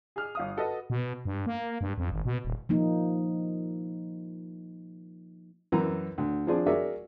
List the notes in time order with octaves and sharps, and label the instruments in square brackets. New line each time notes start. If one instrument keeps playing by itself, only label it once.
[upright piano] G#4 F6
G1 F5 D#6
F#4 A4 B4 D#5
[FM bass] B2
G2
A#3
G2
F2
G#1
B2
D#1
[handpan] F3 A#3 D#4
[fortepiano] F#2 E3 A#4 A#5
D2
F3 C4 D4 G#4 C5
F#4 G#4 A#4 D5 E5